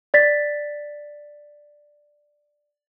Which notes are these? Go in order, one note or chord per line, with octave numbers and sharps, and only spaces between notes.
D5 A6 B6